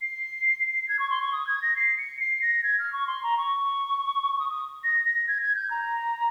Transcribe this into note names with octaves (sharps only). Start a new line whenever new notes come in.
C7
G#6
C#6
C6
C#6
D#6
G#6
A#6
C7
C#7
C7
A#6
G#6
F6
C#6
C6
A#5
C#6
D#6
D#6
A#6
A#6
G#6
G#6
G6
A#5